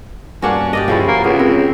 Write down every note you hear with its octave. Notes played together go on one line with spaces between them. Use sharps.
G2 A#3 C#4 D4 F#4
G4 D5 D#5
C#2 F3 C#4 E4
A#3 F#4
C#2 B3
C4 A#4